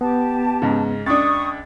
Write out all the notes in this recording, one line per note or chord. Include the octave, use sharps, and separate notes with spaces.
B3 G4 A5
G#2 C#3
C#2 D4 C#6 D#6 A6